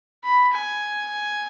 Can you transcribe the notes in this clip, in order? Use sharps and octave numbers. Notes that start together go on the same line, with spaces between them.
B5
G#5